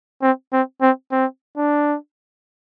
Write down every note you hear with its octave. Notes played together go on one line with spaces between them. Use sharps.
C4
C4
C4
C4
D4